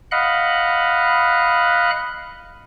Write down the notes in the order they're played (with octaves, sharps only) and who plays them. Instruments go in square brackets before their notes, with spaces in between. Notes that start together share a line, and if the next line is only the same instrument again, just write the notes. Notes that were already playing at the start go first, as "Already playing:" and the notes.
[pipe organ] D#5 F5 F#5 B5 F#6